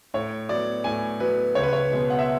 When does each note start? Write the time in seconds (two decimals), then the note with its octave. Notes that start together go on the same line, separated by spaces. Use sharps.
0.14 A2 C#5
0.49 F#3 B3 D5
0.84 A2 G#5
1.20 F#3 B3 B4
1.55 C#2 C#5
1.63 B4
1.73 C#5
1.91 B2 G#3 B3
2.10 F#5
2.19 E5